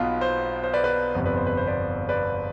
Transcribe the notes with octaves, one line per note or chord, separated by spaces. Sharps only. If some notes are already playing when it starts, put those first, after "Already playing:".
Already playing: B1 B2 B3 F4
C5
C5
B4 D5
B4 D5
G1 F2 C3 F3 B3
B4 D5
C5
B4
C5
B4 D5
B4 D5